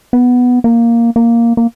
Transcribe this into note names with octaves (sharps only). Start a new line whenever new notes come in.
B3
A#3
A#3
A#3